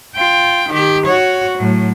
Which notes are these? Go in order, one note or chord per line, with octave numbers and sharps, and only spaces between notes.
F4 G5
D#3 G4
F#4 C#5
A2 F#3